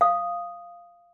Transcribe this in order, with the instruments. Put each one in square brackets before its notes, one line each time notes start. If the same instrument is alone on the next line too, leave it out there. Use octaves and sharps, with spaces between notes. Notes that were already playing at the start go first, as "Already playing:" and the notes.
[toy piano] F5 D#6